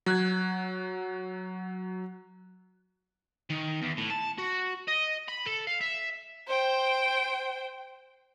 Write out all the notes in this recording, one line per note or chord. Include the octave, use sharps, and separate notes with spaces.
F#3 F#6 G#6
D#3
E2
A2
A5
F#4
D#5
B5
A4
F5
E5
C5 G5